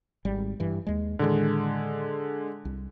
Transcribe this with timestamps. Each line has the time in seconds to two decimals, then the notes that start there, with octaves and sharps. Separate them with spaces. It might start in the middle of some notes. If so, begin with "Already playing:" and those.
0.25 G#1 G3
0.60 G2 E3
0.87 D#2 G#3
1.19 A2 D3 D#3 G#3
2.65 C2